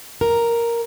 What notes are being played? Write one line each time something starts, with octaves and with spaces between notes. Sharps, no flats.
A#4